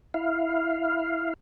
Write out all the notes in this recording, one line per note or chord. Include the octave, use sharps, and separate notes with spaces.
E4 F5